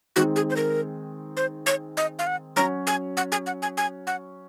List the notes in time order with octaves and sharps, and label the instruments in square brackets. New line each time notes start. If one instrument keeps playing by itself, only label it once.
[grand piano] D#3 G#3 C4 D#4 [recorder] F#4
[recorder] G#4
C5
A#4
C5
C#5
D#5
F5
F#5
[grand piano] F#3 C#4 F#4 C#5 [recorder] A#5
[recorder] G#5
F#5
G#5
F#5
G#5
G#5
F#5